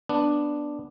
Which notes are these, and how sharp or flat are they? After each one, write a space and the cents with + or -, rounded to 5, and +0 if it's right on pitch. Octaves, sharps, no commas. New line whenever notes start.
B3 +0 D4 +0